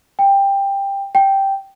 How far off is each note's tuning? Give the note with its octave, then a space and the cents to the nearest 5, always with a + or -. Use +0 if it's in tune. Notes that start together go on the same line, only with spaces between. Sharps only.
G5 +15
G5 -5